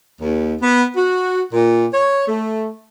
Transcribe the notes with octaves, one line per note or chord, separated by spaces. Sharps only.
D#2
B3
F#4
A#2
C#5
A3